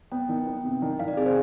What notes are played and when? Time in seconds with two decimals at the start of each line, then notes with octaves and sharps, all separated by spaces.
0.12 B3 G5
0.29 D#3 G5
0.47 B3
0.64 C3
0.82 D#3
0.99 D#3 F5
1.08 D5
1.17 C3 G#4
1.26 C5